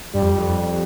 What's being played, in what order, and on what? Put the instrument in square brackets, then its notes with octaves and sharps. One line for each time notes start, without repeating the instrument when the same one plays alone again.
[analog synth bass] G2 [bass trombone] G3
[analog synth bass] F2
F2